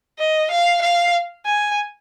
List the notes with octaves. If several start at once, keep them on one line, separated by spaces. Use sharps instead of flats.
D#5
F5
F5
G#5